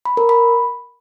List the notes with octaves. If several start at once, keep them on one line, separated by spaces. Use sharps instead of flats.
B5
A#4
B5